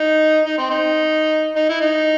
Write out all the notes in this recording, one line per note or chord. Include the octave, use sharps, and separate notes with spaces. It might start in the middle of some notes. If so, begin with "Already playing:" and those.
Already playing: D#4
D#4
C4
C4 D#4
D#4
E4
D#4